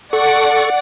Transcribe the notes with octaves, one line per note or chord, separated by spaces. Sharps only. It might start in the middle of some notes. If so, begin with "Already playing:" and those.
A4 D5 F#5 C#6